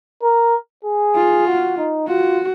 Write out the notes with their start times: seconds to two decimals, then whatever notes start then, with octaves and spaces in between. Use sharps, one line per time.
0.23 A#4
0.84 G#4
1.16 F4
1.47 F#4
1.77 D#4
2.08 F4 F#4